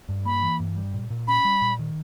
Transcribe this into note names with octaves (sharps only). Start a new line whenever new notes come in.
G2
A#3 B5
E3
G2
G3
A#2
A#2
C#4 B5
G3
A#2
D#3